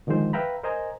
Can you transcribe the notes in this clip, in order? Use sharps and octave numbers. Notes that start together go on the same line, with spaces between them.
D3 D#3 F3 G#3 C5
B4 E5 F5 G5 A#5 B5
A#4 C5 D#5 G#5 A#5